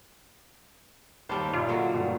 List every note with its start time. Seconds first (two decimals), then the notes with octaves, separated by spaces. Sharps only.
1.29 D#2 G3 C5 A5 B5
1.53 A#2 F4 D#5
1.69 D3 F#3
1.94 G2 A#2 A3